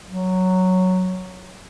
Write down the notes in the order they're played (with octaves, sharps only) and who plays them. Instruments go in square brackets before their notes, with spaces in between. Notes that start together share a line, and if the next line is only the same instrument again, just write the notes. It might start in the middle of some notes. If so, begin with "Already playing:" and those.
[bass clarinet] F#3